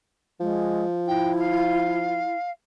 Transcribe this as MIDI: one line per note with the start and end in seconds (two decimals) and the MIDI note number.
0.40 2.23 53
0.40 0.86 56
1.07 2.37 64
1.07 1.32 79
1.38 2.50 77